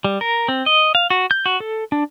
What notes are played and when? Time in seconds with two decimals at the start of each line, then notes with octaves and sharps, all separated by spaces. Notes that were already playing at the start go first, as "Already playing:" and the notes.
0.04 G3
0.21 A#4
0.48 C4
0.66 D#5
0.95 F5
1.10 F#4
1.31 G6
1.46 F#4
1.60 A4
1.92 D4